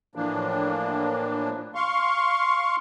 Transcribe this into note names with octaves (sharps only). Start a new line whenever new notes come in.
A2 E3 F3 A#3 D4
F5 C6 C#6